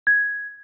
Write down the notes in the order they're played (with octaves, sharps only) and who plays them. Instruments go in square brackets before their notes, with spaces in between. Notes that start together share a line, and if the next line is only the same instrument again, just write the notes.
[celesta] G#6